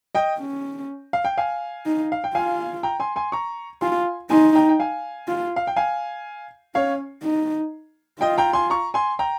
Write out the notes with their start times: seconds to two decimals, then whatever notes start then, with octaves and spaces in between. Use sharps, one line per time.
0.15 D#5 G5
0.39 C#4
1.13 F5
1.25 G5
1.38 F5 G#5
1.86 D#4
2.12 F5
2.24 G5
2.34 F4 F5 G#5
2.83 G5 A#5
3.00 G#5 C6
3.16 G#5 C6
3.32 A#5 C#6
3.81 F4 G#5 C6
4.30 D#4 G#5 C6
4.55 G5 A#5
4.69 G5
4.79 F5 G#5
5.28 F4
5.56 F5
5.67 G5
5.76 F5 G#5
6.75 C#4 C#5 F5
7.23 D#4
8.21 F4 D#5 G5
8.38 G5 A#5
8.53 G#5 C6
8.70 A#5 C#6
8.94 G#5 C6
9.19 G5 A#5